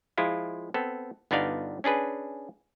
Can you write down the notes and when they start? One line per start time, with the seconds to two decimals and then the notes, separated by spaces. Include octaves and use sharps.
0.18 F3 G#3 E4 F4
0.74 B3 C4 A4
1.31 G1 B3 D4 D#4 D5 F5
1.84 C#4 D4 G#4 B4